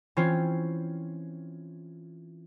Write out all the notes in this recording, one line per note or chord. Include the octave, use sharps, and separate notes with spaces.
E3 C4 C#4 F4 C5 C#5